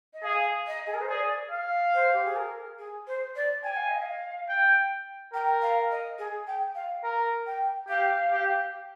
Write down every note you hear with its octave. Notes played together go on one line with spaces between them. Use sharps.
D#5
G#4 F5
D#5
G#4
A#4
C5
G#4 D5
F5
C5
G4
G#4
A#4
G#4
C5
D5
G5 G#5
F5
D#5
F5
G5
A#4 G5
F5
D#5
G#4
G5
F5
A#4
G5
G4 F5
G4